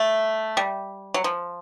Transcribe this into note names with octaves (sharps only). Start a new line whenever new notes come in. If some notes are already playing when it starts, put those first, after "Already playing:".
Already playing: A3
G3
F#3
F3